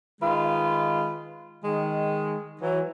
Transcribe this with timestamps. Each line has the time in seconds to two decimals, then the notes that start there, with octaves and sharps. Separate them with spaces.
0.21 D#3 G#3 F4 B4
1.65 D#3 G#3
2.62 E3 F#3